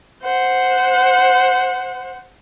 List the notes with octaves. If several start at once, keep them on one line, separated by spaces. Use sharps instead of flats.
C5 F#5